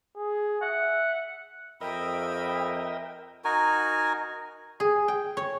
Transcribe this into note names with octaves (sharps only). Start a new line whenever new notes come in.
G#4
E5 F#5
F2 A#4 D#5 E5 G5 B5
D#4 F#4 A#4 G#5
G#4
G5
C#5